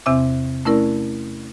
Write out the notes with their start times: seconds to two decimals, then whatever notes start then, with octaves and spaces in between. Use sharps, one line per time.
0.06 E2 C3 C4 E5 D6
0.65 A3 C#4 E4 A#4 D5